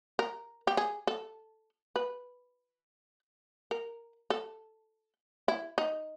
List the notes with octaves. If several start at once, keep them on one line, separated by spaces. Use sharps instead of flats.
A#4
G4
G#4
A4
B4
A#4
A4
E4
D#4